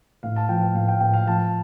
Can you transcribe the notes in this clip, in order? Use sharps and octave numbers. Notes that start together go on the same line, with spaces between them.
A2 F5
A5
F3 G5
F5
A2 F5
G5
A2 G5
F5
F3 A5